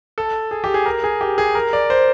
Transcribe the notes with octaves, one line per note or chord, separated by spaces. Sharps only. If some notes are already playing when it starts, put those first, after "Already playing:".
A4
G#4
G4
G#4
A#4
G#4
G4
G#4
A#4
D5
C5